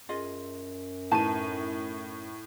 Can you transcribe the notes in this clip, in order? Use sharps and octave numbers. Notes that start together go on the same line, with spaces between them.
F#2 F4 G#4 D#5
A2 D#4 B4 A5 D#7